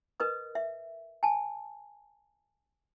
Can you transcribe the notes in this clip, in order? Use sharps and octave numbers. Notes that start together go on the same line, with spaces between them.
A#4 B4 D#5 D#6
E5
G#5 A5